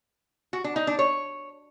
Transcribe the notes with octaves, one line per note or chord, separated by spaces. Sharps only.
F#4
D4
D#4
D4
C#5